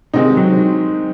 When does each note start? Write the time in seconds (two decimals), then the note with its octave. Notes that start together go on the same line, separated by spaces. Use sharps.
0.13 C3 D#3 G#3 C4 D#4
0.37 F#3